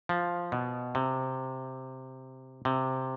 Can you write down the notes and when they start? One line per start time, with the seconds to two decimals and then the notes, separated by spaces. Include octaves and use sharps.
0.09 F3
0.52 B2
0.95 C3
2.65 C3